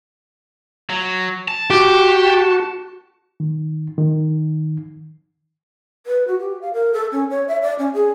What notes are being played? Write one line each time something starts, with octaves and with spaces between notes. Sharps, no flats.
F#3
A5
F#4 G4
D#3
D#3
B4
F#4
G4
F5
A#4
A4
C#4
C#5
E5
D5
C#4
G#4